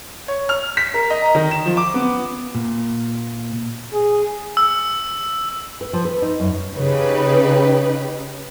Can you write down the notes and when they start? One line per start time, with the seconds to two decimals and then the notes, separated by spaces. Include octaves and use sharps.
0.28 C#5
0.49 F6
0.77 B6
0.94 A#4
1.10 D#5
1.22 A#5
1.35 D#3
1.51 E7
1.66 F3
1.77 D6
1.94 B3
2.55 A#2
3.93 G#4
4.57 E6
5.81 B4
5.93 F3
6.05 B4
6.22 D#4
6.40 F#2
6.75 C#3 D#4 G4 B4